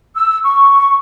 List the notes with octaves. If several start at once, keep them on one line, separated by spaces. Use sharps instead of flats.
E6
C#6